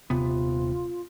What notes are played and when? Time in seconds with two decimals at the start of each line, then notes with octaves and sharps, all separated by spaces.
0.10 D#1 C3 B3 F4